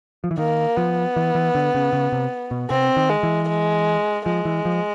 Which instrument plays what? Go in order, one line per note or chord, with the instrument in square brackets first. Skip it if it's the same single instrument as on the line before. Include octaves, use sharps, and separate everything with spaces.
[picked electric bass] F3
E3
[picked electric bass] D#3 [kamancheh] A#3
[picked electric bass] F3 [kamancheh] B3
[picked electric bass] E3
E3
D3
C#3
C#3
C3
B2
[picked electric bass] C3 [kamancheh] C4
[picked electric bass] D#3
[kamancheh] G#3
[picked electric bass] E3
[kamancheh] G#3
[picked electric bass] F3 [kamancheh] G#3
[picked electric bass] E3
F3